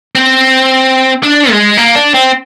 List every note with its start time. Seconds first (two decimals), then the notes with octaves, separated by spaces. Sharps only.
0.15 C4
1.23 D4
1.50 G#3
1.77 A#3
1.95 D4
2.14 C4